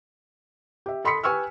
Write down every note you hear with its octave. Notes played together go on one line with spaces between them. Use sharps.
G4 E5
A4 B5 C6 D#6 B6 C#7
G4 B4 G#5 C#6 E6 F6